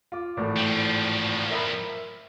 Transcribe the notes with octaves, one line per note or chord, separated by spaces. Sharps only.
F4 D6
G#1 A2 E3
F3 G3
A#4 E5 B5